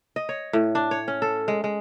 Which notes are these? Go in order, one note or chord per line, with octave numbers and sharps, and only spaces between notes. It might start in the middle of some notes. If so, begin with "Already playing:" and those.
D#5
C#5
A2
D4
C#5
C#4
A4
G#3
G#3